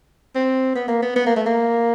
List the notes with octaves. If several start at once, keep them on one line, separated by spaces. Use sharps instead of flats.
C4
B3
A#3
B3
B3
A#3
A3
A#3